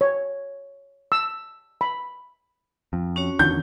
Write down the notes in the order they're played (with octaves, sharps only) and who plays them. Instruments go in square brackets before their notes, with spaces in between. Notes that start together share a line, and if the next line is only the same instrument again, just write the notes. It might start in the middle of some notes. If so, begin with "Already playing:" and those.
[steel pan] C#5
E6
B5
[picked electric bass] F2
[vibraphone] C#4 F#4 C#5
[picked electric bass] E2 D3 D#3 [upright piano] G6